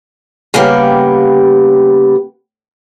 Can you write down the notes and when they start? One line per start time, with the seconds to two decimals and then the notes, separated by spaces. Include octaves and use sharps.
0.54 C#3 G3 A#3 B3 G4 F5